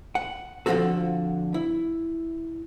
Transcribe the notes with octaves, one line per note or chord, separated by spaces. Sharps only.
F#5
D3 F3 C4 F4 F#4 A4
E4